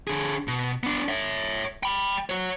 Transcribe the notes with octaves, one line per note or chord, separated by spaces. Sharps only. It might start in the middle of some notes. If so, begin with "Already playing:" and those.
D3 G#4
B2
B3 D4
C#5 E5
G5 B5
F#4 C#5